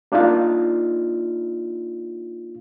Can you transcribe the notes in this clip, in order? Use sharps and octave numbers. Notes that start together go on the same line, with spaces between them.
A#3 D4 D#4 F4 F5